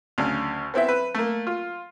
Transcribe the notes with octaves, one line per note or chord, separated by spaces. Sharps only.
D2 C#3
B3 C4 E4 E5
B4
A3 A#3
F4